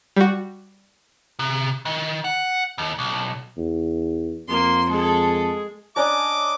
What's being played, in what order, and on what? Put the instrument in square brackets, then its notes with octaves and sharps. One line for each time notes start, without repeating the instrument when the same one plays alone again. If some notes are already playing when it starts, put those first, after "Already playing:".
[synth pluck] G3 F#4
[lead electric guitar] C3
D#3
F#5
D#2
B1
[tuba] E2
[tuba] F2 [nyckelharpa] A#3 [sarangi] C6
[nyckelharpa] G#3 G#4 [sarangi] A4
[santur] C#4 D4 A#5 [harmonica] D#5 D6